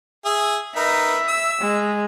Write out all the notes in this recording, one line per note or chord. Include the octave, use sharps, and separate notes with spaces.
G#4 E5 D#6
D#4 A#4 B4 E5
E6
G#3